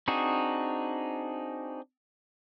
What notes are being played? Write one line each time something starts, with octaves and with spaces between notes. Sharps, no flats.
C4 D4 D#4 F#4 G#4